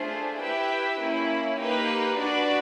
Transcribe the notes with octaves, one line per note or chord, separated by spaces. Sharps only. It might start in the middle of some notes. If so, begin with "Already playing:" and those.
Already playing: A3 D4 F4 G#4 C5
E4 G4 B4 E5 G5
A#3 C#4 E4
A#3 D#4 G4 B4
D4 F#4 B4 D5